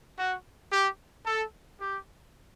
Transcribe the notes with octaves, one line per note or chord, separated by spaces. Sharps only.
F#4
G4
A4
G4